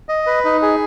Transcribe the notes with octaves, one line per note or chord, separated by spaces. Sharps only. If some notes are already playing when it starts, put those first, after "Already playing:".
D#5
B4
D#4
G#4